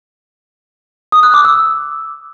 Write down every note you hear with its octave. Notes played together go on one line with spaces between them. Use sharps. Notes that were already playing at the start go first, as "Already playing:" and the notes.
D#6
F#6
D6
E6